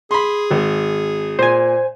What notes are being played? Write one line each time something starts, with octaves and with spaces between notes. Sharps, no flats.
G#4 B5 C6
G#1
A#2 C5 G#5